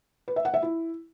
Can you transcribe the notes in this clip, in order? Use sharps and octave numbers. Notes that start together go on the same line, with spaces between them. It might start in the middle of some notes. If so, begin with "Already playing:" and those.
B4
E5
F#5
E5
E4